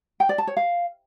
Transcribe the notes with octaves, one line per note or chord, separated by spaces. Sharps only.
G5
D5
A5
C#5
F5